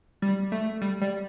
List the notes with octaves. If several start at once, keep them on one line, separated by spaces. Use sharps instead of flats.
G3
A3
G3
G3